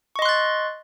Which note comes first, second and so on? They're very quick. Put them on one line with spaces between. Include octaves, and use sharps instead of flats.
C#6 D#5 C6 F#6 A6